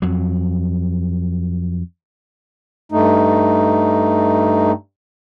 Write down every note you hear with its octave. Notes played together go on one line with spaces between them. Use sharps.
F2 F#3
G2 A3 D#4